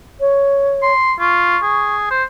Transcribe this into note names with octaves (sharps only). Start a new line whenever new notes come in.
C#5
C6
F4 C#6
G#4
C5